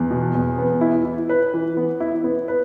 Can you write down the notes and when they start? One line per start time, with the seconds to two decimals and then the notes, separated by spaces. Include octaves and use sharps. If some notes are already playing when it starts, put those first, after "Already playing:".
Already playing: E2
0.11 B2
0.35 E2
0.58 B3
0.81 E4
1.05 E4
1.29 B4
1.54 E3
1.77 B3
2.00 E4
2.24 B3
2.48 B4